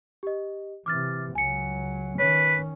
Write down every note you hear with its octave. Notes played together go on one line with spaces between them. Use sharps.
G4 D#5
C3 E3 D6 F6 A6
C#2 F#3 G#5 C#7
D#3 C#4 B4 C#5